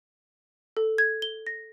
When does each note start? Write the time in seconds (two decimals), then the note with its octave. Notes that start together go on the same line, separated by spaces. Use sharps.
0.77 A4
0.98 G#6
1.22 G7
1.47 A#6